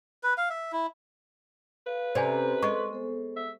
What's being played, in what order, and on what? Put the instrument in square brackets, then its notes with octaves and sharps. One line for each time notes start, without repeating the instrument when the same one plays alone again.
[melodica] B4
F5
E5
E4
[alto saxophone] B4 [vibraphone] F5
[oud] C3 [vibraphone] C#4 A4 A#5 [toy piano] C5 D5 G#5
[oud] G#3 [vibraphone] A4 C6 [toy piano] D#5 C#6
[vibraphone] B3 A4 C5
[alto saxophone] E5